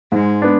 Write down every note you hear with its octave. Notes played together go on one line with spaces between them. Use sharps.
G#2 G#3
B3 D4